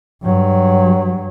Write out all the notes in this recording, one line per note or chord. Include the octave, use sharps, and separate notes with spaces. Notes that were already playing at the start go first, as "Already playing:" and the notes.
G2 F#3